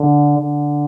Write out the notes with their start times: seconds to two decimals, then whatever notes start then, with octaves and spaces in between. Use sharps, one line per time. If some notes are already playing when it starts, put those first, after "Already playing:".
Already playing: D3
0.38 D3